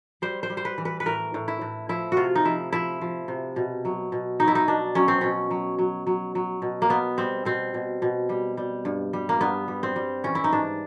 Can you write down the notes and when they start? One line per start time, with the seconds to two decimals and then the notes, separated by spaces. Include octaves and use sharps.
0.22 G3 C5
0.43 C5
0.50 G3
0.57 C5
0.65 B4
0.78 E3
0.85 B4
1.00 B4
1.06 A2 A#4
1.34 A2
1.48 E4
1.61 A2
1.89 F3 E4
2.12 C3 F4 F#4
2.35 D#4
2.45 F3 E4
2.73 F3 E4
3.01 F3
3.28 C3
3.56 B2
3.85 F#3
4.12 B2
4.40 F#3 D#4
4.48 E4
4.55 D#4
4.68 B2 D4
4.95 F#3 C#4
5.08 C4
5.21 B2 C#4
5.51 F#3
5.79 F#3
6.07 F#3
6.35 F#3
6.62 B2
6.82 A#3
6.90 B2 B3
7.18 G3 C4
7.45 B2 C4
7.74 B2
8.02 B2
8.29 G3
8.57 G3
8.85 G2
9.13 G3
9.29 A#3
9.41 G2 B3
9.68 G3
9.83 C4
9.96 G3
10.24 E3 C#4
10.35 E4
10.44 D#4
10.52 G#2 D4